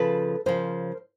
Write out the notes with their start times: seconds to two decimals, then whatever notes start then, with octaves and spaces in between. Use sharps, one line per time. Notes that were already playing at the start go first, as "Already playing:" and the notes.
Already playing: C#3 F3 A4 B4
0.46 C#3 F3 A#4 C5